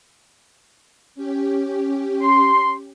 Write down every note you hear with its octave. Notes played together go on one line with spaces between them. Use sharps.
C#4 G4
C6